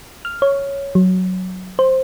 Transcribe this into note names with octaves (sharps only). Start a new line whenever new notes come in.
F6
C#5
F#3
C5